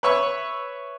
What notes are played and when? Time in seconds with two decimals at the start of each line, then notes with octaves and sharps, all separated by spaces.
0.03 B4 C#5 E5 C#6